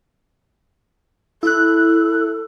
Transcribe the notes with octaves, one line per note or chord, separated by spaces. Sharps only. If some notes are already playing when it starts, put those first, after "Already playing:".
E4 A4 F#6